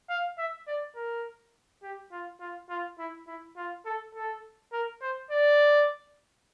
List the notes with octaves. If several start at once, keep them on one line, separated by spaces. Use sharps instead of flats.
F5
E5
D5
A#4
G4
F4
F4
F4
E4
E4
F4
A4
A4
A#4
C5
D5